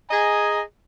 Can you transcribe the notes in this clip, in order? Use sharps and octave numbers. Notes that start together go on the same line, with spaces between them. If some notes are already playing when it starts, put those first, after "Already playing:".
G#4 D#5 G#5 A#5